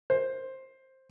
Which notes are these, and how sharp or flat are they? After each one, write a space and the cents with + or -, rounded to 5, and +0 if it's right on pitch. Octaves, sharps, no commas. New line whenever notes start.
C5 +10